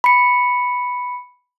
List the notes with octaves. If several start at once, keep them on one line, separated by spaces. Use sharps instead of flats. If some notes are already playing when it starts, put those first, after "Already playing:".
B5 C#7